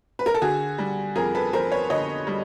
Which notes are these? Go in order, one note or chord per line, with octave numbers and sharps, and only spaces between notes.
B4
A#4
A4
D3 F#4 G#4
G3
F2 G#4 A#4
A4 B4
F2 A#4 C5
B4 C#5
D3 C#5 D#5
G3